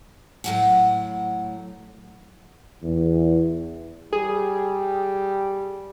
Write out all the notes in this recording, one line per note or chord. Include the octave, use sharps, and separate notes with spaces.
A2 F#3 F#5
E2
G3 G#4